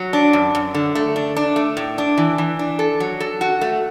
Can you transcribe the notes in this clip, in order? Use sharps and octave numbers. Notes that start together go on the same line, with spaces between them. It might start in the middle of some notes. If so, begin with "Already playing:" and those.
Already playing: F#3
D4
F#2
F#2
D3
A3
D4
D4
A3
A2
D4
E3
E3
D4
A4
F#3
A4
F#4
A3